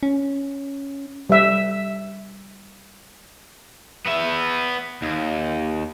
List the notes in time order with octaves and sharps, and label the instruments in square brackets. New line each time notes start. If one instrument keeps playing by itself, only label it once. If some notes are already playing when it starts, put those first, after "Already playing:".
[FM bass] C#4
[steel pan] G3 E5
[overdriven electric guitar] B3 E5
D#2